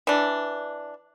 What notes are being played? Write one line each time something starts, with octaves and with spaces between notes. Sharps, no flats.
E3 D4